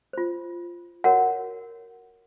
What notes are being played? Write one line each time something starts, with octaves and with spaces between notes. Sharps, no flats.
F4 C5
F#4 A#4 C#5 F#5